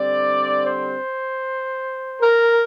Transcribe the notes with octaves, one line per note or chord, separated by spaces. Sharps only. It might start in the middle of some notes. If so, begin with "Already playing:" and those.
Already playing: D3 G3 C4 D5
C5
A#4